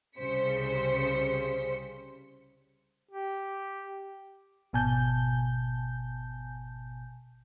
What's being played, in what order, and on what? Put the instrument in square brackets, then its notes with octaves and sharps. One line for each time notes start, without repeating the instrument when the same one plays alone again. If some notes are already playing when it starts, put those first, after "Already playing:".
[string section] C2 C#3 G3 C5 B6 C#7
[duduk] G4
[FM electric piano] G#1 B2 G#5 A5 G6